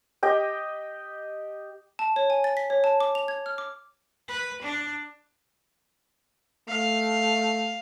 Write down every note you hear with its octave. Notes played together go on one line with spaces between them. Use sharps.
G4 D#5 G5
A5
C#5
G#5
A6
B6
C#5
A5
D6
F7
G#6
F6
D6
B4
D4
A3 F5